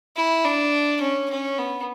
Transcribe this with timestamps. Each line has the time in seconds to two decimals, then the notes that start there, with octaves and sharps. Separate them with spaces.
0.17 E4
0.45 D4
1.01 C#4
1.30 C#4
1.58 B3